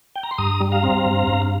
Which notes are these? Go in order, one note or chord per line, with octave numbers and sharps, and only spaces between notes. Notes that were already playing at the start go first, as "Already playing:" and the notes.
G5
A#5
C6
G2 A#5 D#6
G3
F5 A#5
C4
G2
G2